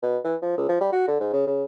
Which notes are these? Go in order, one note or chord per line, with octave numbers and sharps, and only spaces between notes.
B2
E3
F3
C#2
F3
G3
F#4
D3
G#2
C#3
C#3